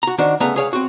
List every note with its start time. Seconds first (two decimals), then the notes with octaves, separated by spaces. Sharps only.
0.03 F#4 A#5
0.18 D#3 D4 F#4 C5
0.40 C#3 A3 B3 A#5
0.56 G#4 C#5 F5
0.73 C4 F#4